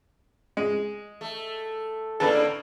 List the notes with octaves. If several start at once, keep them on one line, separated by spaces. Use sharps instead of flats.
G#3
A3
A2 D3 A#3 A4 B4